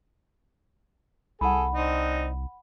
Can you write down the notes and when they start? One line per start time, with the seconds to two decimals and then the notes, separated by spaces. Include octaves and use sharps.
1.41 C2 G#4 A4 F#5 B5
1.75 C4 D4 D#4